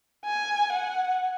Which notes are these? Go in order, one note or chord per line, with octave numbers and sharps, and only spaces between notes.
G#5
F#5